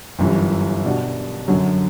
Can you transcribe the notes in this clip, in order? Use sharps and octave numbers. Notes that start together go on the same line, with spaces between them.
G1 F#2 E3 G3
B2 G3 D4 F#4
F#2 D3 F#3